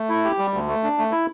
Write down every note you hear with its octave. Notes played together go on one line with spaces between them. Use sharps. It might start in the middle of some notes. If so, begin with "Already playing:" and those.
Already playing: A3
E4
G4
G3
D2
A3
D4
A3
E4